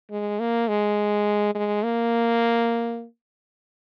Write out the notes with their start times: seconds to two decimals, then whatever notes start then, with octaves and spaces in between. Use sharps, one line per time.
0.11 G#3
0.40 A#3
0.68 G#3
1.55 G#3
1.84 A#3